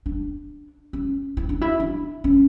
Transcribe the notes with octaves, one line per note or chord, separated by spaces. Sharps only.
D4
C#4
E4
D4
E4
D4
C#4